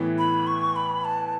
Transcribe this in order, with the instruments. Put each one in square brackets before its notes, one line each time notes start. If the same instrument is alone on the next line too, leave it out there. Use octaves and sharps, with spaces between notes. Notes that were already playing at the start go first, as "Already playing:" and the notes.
Already playing: [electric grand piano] A2 E3 B3 E4
[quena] B5
C#6
B5
A5